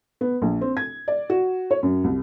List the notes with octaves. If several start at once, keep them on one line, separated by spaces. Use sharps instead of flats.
B3
A#1
C4
G#6
D5
F#4
C#5
F#2
C2